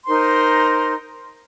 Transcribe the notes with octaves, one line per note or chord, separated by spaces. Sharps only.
D#4 A#4 C5 C6